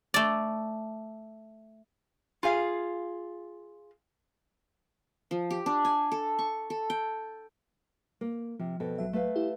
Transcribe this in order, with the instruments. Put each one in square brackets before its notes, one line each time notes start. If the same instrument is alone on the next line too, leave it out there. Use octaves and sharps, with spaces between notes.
[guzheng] A3 D5
[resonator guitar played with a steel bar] F4 G#4 F5
[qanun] F3
G4
D4
G#5
A4
C#6
A4
G5
[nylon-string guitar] A#3
[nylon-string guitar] C3 [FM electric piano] F3
[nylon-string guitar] F2 B2 A4
[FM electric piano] A1 F#3 E5
[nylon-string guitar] A3 B4 F5
[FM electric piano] E4 G4